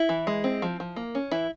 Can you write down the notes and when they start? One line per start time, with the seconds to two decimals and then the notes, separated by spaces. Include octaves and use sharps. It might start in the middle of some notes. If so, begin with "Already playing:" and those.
Already playing: E4
0.09 E3
0.27 G#3
0.44 C4
0.62 F3
0.80 F3
0.96 A#3
1.15 C#4
1.31 E3 E4